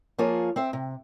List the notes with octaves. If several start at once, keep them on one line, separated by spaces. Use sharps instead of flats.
F3 A#3 F4 G#4 C#5
C4 C5 E5
C3